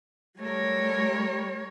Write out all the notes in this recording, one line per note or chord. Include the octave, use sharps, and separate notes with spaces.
G3 A3 A#4 C#5